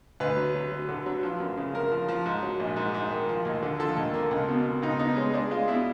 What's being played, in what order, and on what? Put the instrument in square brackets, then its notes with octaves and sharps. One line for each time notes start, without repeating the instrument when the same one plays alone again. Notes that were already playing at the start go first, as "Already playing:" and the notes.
[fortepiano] D2 B4
F#3
F#3
F#3
D3
F#3
F3
F#2
C#3
F#2 A#4
F3
F3
G#2
F#3
A#1
G#2
G#2
D#3
F3
D#2
D3
F3 A4
D#2
A#3
C#2
B2
B2
C#2 D#4
B3 D#4
G#3 C#4
G#3 D4
G#3 F4
B2 E4